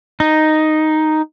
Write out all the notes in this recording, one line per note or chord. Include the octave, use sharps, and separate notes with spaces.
D#4